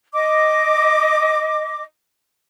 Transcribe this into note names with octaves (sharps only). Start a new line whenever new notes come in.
D#5 D6